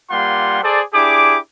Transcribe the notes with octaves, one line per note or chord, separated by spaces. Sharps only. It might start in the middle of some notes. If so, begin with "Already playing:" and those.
G3 A#3 F4 G4 F#5 C6
G#4 A4 C5 D5
D4 E4 G4 G#4 D6